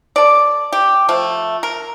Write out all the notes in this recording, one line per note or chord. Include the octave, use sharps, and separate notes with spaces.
A4 D5
G4
F3 A3
A#4